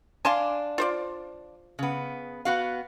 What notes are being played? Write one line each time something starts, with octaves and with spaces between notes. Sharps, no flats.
D4 F5 G#5 A5 C6
F4 C5 D5
C#3 B3
B3 F#4 F5